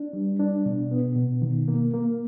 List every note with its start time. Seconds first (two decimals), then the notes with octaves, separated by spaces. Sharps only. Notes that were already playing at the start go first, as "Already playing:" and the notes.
Already playing: D4
0.13 G3
0.39 D4
0.66 B2
0.91 B3
1.16 B2
1.42 D#3
1.68 A#3
1.93 A#3